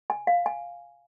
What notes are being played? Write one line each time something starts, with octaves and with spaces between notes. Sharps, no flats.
G#5
F5
G#5